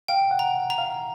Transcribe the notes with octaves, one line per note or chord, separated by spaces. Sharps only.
F5 G5
F#5
A#5
A#5
F5